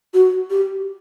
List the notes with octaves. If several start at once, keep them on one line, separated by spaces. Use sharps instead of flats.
F#4
G4